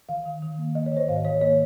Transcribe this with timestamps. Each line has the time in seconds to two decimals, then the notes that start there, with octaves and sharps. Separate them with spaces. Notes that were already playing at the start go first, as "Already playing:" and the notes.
0.09 D#3 F5
0.25 D#3
0.42 D#3
0.59 A#3
0.75 A#3 D#5
0.86 C#5
0.92 D#3 C5
1.09 G#2 F5
1.16 D#5
1.25 D#3 C#5
1.41 A#3 C#5